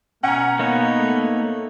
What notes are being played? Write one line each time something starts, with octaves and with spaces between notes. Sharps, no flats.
B2 C#4 F#5 A#5
A#3 B3 D#4 C#5
A3